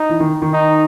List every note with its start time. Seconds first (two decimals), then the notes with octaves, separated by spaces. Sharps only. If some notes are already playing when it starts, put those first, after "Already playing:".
Already playing: D#4
0.09 E3
0.20 D#3
0.42 D#3
0.53 D#4